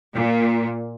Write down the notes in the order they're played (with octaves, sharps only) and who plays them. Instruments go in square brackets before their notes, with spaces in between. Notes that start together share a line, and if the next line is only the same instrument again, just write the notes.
[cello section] A#2